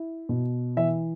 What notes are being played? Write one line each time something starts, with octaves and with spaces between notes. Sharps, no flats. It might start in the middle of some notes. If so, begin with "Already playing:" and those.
Already playing: E4
B2
E3 E5